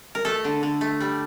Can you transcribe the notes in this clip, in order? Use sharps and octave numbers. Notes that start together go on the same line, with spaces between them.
A#4
A3 A4
D3
D3
A3
G3